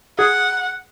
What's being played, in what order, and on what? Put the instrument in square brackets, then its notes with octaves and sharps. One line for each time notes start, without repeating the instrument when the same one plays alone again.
[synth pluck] G#4 [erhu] F#5